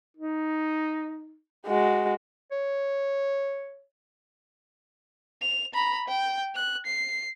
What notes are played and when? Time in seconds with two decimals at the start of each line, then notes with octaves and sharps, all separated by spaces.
0.17 D#4
1.67 G#3 F#4
2.51 C#5
5.42 F7
5.74 A#5 B5
6.08 G5
6.55 F#6
6.86 C7